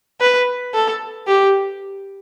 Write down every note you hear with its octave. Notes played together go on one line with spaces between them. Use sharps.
B4
A4
G4